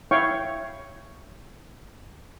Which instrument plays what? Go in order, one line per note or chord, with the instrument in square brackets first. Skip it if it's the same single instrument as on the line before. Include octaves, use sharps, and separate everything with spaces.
[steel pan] E4 C#5 F5 G5 C#6